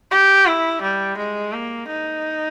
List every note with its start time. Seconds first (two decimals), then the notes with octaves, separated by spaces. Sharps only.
0.11 G4
0.47 E4
0.82 G3
1.18 G#3
1.53 A#3
1.88 D#4